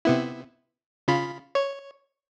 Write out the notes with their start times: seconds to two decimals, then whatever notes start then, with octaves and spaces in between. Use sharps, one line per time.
0.05 C3 B3 E4
1.08 C#3 F4 B5
1.55 C#5